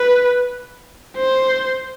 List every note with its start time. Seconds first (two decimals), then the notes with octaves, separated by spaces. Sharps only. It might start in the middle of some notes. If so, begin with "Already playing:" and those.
Already playing: B4
1.17 C5